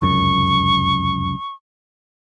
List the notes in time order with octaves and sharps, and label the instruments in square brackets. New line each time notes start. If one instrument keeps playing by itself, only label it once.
[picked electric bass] F1 C#2 F#2 [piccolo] C#6